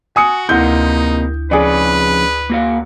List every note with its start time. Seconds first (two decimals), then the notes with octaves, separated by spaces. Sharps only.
0.16 F#4 G#5 D#6 C#7
0.49 D2 C3 A#3 D#4 E4 G6
1.51 F2 C#3 C#4 G#4 B4 D5
2.50 A#3 F#4 F5